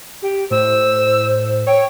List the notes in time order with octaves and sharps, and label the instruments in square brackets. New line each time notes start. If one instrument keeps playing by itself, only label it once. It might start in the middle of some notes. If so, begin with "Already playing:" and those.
[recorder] G4
[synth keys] A2 [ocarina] C5 [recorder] E6
[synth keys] C#5 [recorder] G5